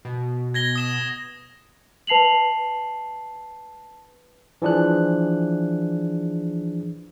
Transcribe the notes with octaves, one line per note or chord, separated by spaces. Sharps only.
B2
G#6 A#6 G7
D#6 E7 G7
B4 A5 C7 F7 F#7
E3 F3 D4 G#4 F#6